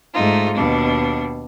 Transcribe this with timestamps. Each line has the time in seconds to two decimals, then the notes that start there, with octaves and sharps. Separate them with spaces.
0.12 G#2 A3 D#4 F4
0.55 D#2 B2 D4